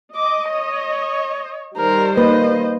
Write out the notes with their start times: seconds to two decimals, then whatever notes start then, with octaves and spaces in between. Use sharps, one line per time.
0.15 D#5 D6
0.50 C#5
1.77 D#3 G3 A#4 C5
2.17 A#3 B4 D#5